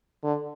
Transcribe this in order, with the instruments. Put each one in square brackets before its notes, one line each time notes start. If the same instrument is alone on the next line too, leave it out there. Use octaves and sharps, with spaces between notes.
[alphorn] D3